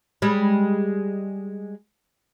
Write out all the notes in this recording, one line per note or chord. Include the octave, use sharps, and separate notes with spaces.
G3 G#3